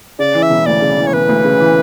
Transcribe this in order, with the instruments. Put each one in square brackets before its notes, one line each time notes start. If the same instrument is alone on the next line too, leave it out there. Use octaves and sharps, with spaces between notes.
[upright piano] C#3 [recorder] D5
[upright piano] E3
[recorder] E5
[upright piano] E1
[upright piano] D2 [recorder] D5
[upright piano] C#3
E3
[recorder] C#5
[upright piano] E1 [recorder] B4
[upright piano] D2
C#3
E3